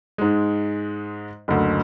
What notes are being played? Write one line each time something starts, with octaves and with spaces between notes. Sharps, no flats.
G#2 G#3
F#1 D2